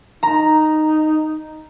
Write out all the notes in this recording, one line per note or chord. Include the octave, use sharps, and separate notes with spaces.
D#4 A#5